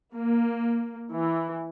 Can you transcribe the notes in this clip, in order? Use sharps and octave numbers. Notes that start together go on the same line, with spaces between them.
A#3
E3